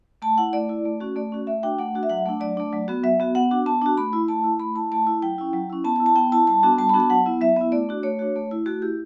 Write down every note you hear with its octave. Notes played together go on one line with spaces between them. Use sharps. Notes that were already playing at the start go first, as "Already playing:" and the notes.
A3 A5
E4 F#5
A3 D5
E4
A3
C#4 F#4
A3 D5
C#4 F#4
A3 E5
D4 F#4 G5
A3 F#5
D4 F#4
E5
F#3 F#5
A3 D4
F#3 D5
A3 D4
F#3
B3 F#4
F#3 E5
B3 F#4
B3 F#5
D4 F#4
B3 A5
D4 F#4
A3 B5
E4
A3 A5
E4
A3 B5
E4 A5
A3 A5
E4
F#3 G5
C#4 E4
F#3
C#4 E4
B3 A5
A5
E4
A5
B3 G5
E4 A5
G3 A5
B3 D4 F#4
G3 A5
B5
B3 D4 F#4
A5
F#3 F#5
B3 E4
F#3 E5
B3 E4
A3 D5
D4 F#4
A3 C#5
D4 F#4
A3
E4
A3 F#4
E4 G4